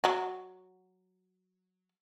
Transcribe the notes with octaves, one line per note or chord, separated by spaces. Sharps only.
F#3 F#4